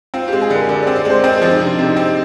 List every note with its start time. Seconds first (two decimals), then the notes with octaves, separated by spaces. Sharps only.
0.14 C4 F4
0.28 G#3 G4
0.41 G#4
0.50 D3 A#4
0.69 D3 D5
0.82 D5
0.87 C4
0.96 D5
1.05 G#3 C5
1.24 C4 D#5
1.37 F3 C5
1.51 D#4
1.60 C3 D4
1.79 C3
1.97 C4